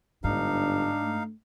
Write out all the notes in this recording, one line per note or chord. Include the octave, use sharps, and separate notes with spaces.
G1 G#2 D4 D#4 F5
A3